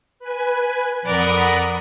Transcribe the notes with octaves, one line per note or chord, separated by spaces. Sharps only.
B4 G#5
F2 A#4 D5 F#5 B5 D#6